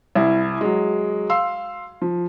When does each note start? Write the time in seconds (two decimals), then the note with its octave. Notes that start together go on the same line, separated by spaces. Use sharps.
0.15 C2 E4
0.61 F#3 G#3
1.30 F5 C6 E6
2.02 F3